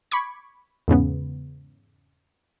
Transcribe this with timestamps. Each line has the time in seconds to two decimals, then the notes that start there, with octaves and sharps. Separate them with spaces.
0.12 B5 C#6 D6 G#6
0.88 E2 G#2 C#3 B3